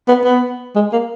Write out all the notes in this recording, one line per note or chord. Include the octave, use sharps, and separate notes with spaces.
B3
B3
G#3
A#3